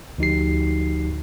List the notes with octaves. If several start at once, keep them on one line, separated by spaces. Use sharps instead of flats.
D2 F3 D#4 F#4 G4 C7